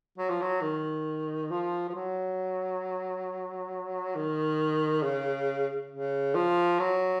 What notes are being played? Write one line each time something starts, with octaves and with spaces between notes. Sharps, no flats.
F#3
F3
F#3
D#3
F3
F3
F#3
D#3
C#3
C#3
F3
F#3